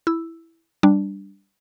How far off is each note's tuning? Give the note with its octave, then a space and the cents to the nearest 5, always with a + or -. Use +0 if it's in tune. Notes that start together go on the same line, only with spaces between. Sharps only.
E4 +0 E6 +0
G3 +0 D4 +0